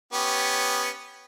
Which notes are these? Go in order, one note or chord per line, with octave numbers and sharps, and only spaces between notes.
B3 C#4 G4